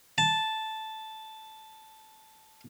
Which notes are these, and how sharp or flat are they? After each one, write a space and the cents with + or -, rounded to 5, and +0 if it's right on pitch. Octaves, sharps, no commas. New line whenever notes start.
A5 -5